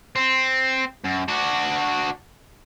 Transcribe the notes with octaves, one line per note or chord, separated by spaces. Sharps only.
C4
F#2
D4 F#4